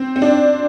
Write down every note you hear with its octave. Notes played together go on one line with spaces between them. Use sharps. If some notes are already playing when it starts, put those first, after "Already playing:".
Already playing: C4
C4
D4